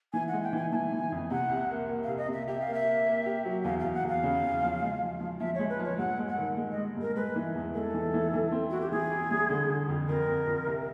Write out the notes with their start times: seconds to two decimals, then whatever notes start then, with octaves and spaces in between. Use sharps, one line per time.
0.13 E3 G#5
0.28 G#3 F#5
0.43 G5
0.53 E3 G#5
0.72 E3 G#5 A5
0.92 E3
1.12 F2
1.30 C3 F#5
1.49 C2
1.70 A#3
1.89 A#3
2.04 C2 F5
2.18 D#5
2.28 C3 E5
2.48 G4 E5
2.60 F5
2.67 A#3
2.74 E5
2.86 A#3
3.06 A#3
3.26 G4
3.45 F#3
3.64 E2 F5
3.79 F5
3.84 E2
3.94 F#5
4.04 E2
4.09 F5
4.23 C#3
4.42 E2
4.62 F3
4.82 G#3
5.02 F3
5.21 F3
5.40 F3 E5
5.55 G#3 C#5
5.70 B4
5.79 F3 C#5
5.98 G2 F#5
6.19 G#3
6.28 F#5
6.38 D#3
6.57 G#3
6.72 D#5
6.77 G#3
6.97 G2 A#4
7.16 G#3 B4
7.36 E3
7.55 E2
7.74 G#3 A4 A#4
7.94 E3
8.14 E3
8.34 E3
8.52 C4
8.71 E4 F#4
8.81 G4
8.91 E3 G#4
9.11 E4
9.31 G3
9.50 D3
9.70 D3
9.88 F2
10.09 F2 A#4
10.28 F2
10.47 F2
10.67 C2